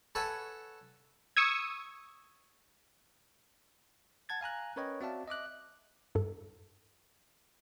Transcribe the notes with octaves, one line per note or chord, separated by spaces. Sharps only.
A4 B4 C#5 F#5 G#5 A5
C#6 D#6 E6 G#6
F#5 A5 G#6 A6
F5 G#5 A#5 F#6
C#4 A#4 B4 C#5 D#5 G5
C4 F#4 D5 E5 F5 A5
D#5 E5 D6 F#6
G2 A4